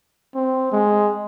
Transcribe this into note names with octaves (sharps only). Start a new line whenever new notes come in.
C4
G#3